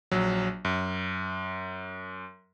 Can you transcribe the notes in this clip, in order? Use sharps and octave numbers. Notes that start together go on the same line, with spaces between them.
A#1 F#3
F#2